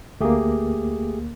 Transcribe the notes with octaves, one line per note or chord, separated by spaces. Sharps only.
D2 A3 A#3 G4 G#4